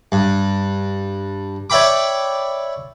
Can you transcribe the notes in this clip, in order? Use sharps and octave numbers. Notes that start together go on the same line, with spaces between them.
G2
C#5 D5 E5 G5 B5 D6